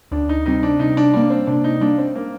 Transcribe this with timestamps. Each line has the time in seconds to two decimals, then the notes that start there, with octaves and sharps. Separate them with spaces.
0.11 D2 D4
0.29 D#4
0.46 C3 G3 C4 D#4
0.63 D4
0.79 C3 D#4
0.97 D4
1.14 G3 A#3 D4
1.30 C4
1.47 C3 D4
1.64 D#4
1.81 G3 A#3 D4
1.98 C4
2.15 A#3